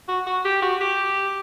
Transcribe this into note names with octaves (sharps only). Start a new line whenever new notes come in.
F#4
F#4
G4
F#4
G4